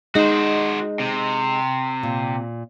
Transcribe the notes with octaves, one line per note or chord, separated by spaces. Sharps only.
G#3 D#4 F#4 C5
C3
A#2